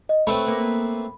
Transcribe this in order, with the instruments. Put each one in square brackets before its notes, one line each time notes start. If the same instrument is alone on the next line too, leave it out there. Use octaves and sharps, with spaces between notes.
[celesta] D#5
[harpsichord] A3 C4 B4 [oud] C#5 [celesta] B5
[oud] A#3 B3